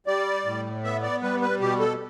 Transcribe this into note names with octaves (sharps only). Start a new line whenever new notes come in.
G3 D5
A2
B3 E5
D5
G3 B4
B4
B2 G4
A4